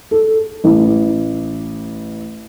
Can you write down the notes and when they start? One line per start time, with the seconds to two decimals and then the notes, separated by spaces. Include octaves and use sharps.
0.11 A4
0.64 A1